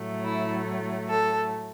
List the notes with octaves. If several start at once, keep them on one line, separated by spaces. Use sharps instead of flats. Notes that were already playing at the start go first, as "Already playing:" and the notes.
Already playing: A2 F#3 A3
E4
A4